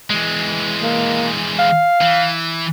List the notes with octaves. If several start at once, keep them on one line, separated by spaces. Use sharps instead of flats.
E3 G#3
A#3
F5
E3